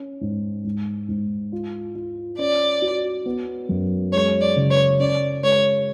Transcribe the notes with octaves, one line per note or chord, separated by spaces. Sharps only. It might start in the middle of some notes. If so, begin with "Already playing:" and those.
Already playing: C#4
G#2
G#2
G#2
F4
F4
C#4 D5
F#4
B3
F#2
G#3 C#5
D5
C#3
C#5
C#4 D5
G#3 C#5